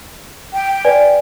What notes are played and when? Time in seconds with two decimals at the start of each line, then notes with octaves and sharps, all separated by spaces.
0.53 G5
0.85 B4 D5 G#5